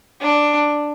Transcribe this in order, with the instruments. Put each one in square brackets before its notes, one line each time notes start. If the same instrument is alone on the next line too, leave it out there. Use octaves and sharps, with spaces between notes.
[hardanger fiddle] D4